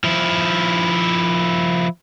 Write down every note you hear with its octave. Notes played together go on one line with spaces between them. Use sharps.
F3 E4